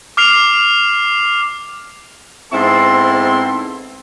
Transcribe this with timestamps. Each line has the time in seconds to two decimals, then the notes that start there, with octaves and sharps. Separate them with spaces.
0.17 D6 F6 C7 F7
2.52 G#2 B3 C4 E4 A4 C6